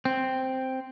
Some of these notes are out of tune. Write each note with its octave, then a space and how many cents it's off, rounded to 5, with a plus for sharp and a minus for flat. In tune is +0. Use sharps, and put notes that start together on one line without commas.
C4 +0